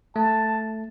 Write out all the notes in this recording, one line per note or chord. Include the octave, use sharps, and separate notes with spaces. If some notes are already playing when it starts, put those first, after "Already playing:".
A3 A5